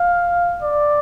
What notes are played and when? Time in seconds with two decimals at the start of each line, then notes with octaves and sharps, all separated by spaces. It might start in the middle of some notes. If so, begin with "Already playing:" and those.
Already playing: F5
0.62 D5